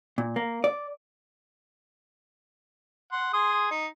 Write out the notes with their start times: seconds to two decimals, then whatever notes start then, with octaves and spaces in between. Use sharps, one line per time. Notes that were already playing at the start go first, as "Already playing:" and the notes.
0.18 A#2
0.36 A#3
0.64 D5
3.12 F#5 C6
3.33 G#4 C6 D#6
3.71 D#4